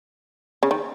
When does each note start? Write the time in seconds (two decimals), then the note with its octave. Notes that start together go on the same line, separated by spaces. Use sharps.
0.63 C#3
0.71 D#3